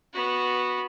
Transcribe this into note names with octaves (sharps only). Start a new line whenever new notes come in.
B3 F#4